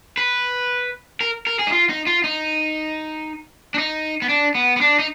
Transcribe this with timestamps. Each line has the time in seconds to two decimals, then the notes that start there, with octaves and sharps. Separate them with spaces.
0.17 B4
1.21 A#4
1.47 A#4
1.59 G#4
1.67 D#4
1.72 F4
1.89 D#4
2.07 F4
2.24 D#4
3.74 D4
3.78 D#4
4.22 B3
4.29 D4
4.55 B3
4.77 B3
4.81 D4
4.99 D#4